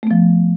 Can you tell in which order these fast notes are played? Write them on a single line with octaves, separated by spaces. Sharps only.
A3 B3 F3